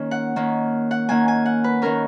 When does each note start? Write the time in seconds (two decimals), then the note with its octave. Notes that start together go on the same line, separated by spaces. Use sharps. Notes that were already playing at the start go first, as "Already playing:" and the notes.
Already playing: D#3 A#3 C#4
0.11 F#5
0.36 D#3 A#3 C#4
0.91 F#5
1.09 D#3 A#3 C#4 G#5
1.28 G#5
1.46 F#5
1.64 B4
1.82 D#3 A#3 C#4 A#4